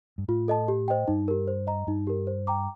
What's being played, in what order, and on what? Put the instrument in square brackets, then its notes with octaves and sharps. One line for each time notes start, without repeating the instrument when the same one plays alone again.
[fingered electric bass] G2
[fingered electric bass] A2 [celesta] F4
[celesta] A4 D#5 A5
G4
C5 D#5 G5
[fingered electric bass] G2 [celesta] D#4
[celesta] G4 A#4
C5
D#5 A#5
[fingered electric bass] G2 [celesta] D#4
[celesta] G4 A#4
C5
G5 A#5 D6